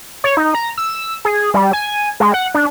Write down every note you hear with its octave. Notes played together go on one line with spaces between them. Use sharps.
C#5
D#4
A#5
E6
G#4
G3
G#5
G#3
F#5
D4